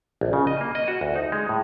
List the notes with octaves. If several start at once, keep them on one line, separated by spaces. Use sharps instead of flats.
A#1
C#3
D#5
A#3
D#5
F#4
D2
D#4
G#3
A2